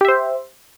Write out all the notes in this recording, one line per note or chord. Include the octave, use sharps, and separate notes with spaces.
G4 C5 E5